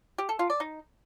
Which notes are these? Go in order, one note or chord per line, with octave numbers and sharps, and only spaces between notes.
G4
A4
F4
D5
D#4